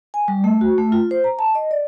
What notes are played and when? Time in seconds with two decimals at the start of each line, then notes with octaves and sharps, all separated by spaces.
0.14 G#5
0.28 G3
0.44 A3
0.61 F#4
0.78 A3
0.92 F4
1.11 C5
1.24 A#5
1.39 A5
1.55 D#5
1.71 D5